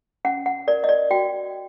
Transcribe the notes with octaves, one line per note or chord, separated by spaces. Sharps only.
C#4 F#5
F#5
A#4 D5
D#5
D5
F#4 G5